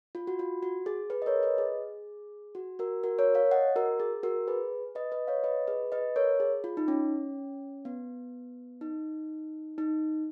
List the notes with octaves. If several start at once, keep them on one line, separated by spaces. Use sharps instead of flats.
F4
F#4
F4
F#4
G#4
G#4 B4
D#5
A#4 C#5
B4 D#5
G#4
F#4
F#4 A#4
F#4 A#4
A#4 C#5
C#5 F5
D#5 F#5
F#4 A#4
G#4
F#4 A#4
G#4 B4
B4 D#5
B4 D#5
C#5 F5
B4 D#5
G#4 B4
B4 D#5
A#4 C#5
G#4
F4
D#4
C#4
B3
D#4
D#4